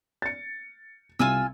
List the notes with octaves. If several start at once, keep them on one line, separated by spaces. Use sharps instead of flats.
A6 C#7
C2 F4 G#5 E6